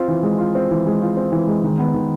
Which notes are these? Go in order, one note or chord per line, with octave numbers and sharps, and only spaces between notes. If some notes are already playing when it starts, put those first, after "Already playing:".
Already playing: C4 F4
E3
G#3
F4
C4
E3
G#3
F4
C4
E3
G#3
D#3
B3
D#3